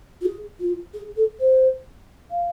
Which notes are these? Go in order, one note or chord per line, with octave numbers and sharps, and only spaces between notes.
F4
G#4
F4
G#4
A4
C5
F5